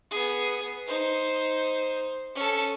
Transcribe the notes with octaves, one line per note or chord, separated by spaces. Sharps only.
B3 G#4
D#4 C5
C#4 A4